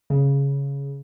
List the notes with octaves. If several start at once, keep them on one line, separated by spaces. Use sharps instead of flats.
C#3